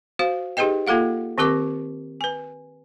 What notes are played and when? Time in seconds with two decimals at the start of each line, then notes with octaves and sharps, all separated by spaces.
0.19 F#4 C5 F5
0.57 D#4 G4 G#4 B4 D#5 G5
0.87 A#3 F4 A4 F5 F#5
1.38 D#3 C4 G4 A#4 D6
2.21 B4 G#5